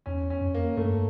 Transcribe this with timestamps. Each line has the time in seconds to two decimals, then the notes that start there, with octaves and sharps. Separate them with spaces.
0.06 E2 C#4
0.30 C#4
0.41 F2
0.55 A#3
0.77 G2 A3